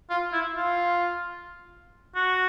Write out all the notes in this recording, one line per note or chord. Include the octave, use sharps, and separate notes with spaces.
F4
E4
F4
F#4